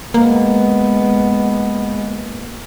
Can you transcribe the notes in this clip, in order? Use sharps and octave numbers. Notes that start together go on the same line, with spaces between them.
G#3 A#3 B3